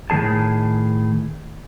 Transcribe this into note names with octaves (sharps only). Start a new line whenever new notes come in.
A2 D#3 G3 G#4 A5